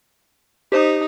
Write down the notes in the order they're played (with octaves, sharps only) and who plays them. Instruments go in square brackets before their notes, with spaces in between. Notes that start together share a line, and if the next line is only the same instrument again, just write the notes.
[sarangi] D#4 [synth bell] G4 C5 D#6